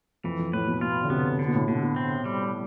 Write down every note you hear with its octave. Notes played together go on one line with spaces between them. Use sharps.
F2 E3
F2
A2 B4
B2
B2 F4
D3
C3 B3
D3
B2
A2
B2 D3
B2
C4
G3